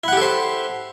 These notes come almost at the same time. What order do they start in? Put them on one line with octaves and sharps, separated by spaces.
E4 F#5 G4 A4 C5